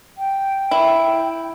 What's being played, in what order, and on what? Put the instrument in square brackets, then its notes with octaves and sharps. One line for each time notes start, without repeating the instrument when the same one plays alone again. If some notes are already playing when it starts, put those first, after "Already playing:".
[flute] G5
[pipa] E4